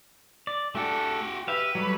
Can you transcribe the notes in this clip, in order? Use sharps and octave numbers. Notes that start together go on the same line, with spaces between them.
D5
A3 D4 F#4 G4 A4
G4 B4 E5 F5
F#3 G3 A3